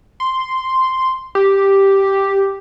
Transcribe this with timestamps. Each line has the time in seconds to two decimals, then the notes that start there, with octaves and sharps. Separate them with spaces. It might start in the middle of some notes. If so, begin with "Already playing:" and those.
0.20 C6
1.35 G4